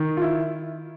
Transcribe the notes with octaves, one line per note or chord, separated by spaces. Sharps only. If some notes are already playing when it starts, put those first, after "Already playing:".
Already playing: D#3
F4
E4